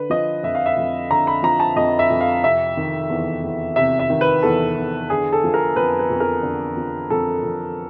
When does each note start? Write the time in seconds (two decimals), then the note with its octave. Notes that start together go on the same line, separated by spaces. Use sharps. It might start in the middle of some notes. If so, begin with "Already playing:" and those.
Already playing: D3 B4
0.10 F3 D#5
0.43 F2 E5
0.55 F5
0.66 E5
0.77 F2
1.10 D3 A#5
1.27 B5
1.43 F3 A#5
1.60 A5
1.76 F2 D#5
1.99 E5
2.10 F2
2.21 F5
2.44 C3 E5
2.77 D#3
3.10 E2
3.43 E2
3.76 C3 E5
3.99 E5
4.10 D#3
4.21 B4
4.43 E2 A4
4.77 E2
5.10 D3 G#4
5.33 A4
5.44 F3
5.54 A#4
5.76 F2 B4
5.99 B4
6.10 F2
6.20 A#4
6.43 D3
6.77 F3
7.10 F2 A4
7.43 F2